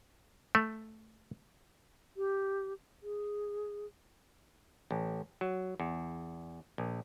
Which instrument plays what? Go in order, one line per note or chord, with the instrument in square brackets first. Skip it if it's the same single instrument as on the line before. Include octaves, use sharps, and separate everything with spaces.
[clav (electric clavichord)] A3
[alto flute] G4
G#4
[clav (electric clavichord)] A1
F#3
E2
A#1